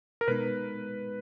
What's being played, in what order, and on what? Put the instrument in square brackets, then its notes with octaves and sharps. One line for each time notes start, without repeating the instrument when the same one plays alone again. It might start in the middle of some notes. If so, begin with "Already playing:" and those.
[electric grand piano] A#4
[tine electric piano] B2 G#3 B3 D#4 [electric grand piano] B4